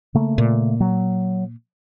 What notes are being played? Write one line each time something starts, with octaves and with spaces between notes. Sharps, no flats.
C#3 A3 A#3
A#2
F#3